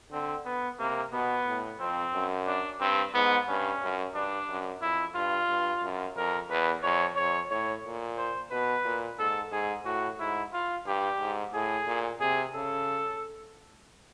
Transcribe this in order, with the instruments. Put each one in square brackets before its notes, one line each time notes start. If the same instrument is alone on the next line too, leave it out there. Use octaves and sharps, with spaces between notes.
[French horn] D3 [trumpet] C4
[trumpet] B3
[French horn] C3 [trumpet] A#3
[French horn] B2 [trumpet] B3
[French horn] A2
[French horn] F2 [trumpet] C4
[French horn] F#2
[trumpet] D4
[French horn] G2 [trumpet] C4
[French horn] G#2 [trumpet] B3
[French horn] G2 [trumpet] C#4
[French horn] F#2
[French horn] G2 [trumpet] D4
[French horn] F#2
[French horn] F2 [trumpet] E4
[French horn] G2 [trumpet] F4
[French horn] G2
F#2
[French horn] F2 [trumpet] A#4
[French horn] E2 [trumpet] B4
[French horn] F2 [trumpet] C#5
[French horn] F2 [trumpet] C#5
[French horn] A2 [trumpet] C#5
[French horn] A#2
[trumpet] C5
[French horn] B2 [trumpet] B4
[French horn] A#2
[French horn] G#2 [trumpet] A4
[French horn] G#2 [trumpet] G#4
[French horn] A2 [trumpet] F#4
[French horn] G#2 [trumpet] E4
[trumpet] F4
[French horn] G2 [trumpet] G4
[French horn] G#2
[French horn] A2 [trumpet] G#4
[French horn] A#2
[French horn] C3 [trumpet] G#4
[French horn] C#3 [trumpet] A4